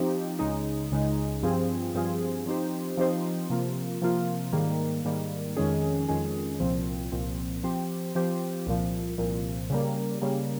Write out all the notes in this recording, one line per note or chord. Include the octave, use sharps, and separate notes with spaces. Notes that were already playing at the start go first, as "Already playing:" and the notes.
Already playing: F3 C4 D#4 G4
C#2 C#3 G#3 D#4
C#2 C#3 G#3 D#4
G2 F3 C4 F4 G#4
G2 F3 C4 F4 G#4
F3 C4 D#4 G4 C5
F3 C4 D#4 G4 C5
C3 F3 A#3 F4
C3 F3 A#3 F4
G#2 D#3 G3 A#3
G#2 D#3 G3 A#3
F2 D#3 G#3 C#4 G#4
F2 D#3 G#3 C#4 G#4
C2 A#2 F3 C4
C2 A#2 F3 C4
F3 C4 G4 C5
F3 C4 G4 C5
C2 A#2 F3
C2 A#2 F3
C#3 G3 A#3
C#3 G3 A#3